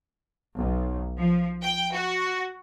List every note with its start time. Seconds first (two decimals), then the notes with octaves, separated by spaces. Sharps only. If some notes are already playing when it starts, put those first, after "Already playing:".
0.56 B1
1.18 F3
1.63 G5
1.94 F#4